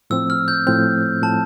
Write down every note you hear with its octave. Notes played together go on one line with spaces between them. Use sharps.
A2 F3 C4 E6
F6
G6
A2 F3 C4 G6
A2 F3 C4 A5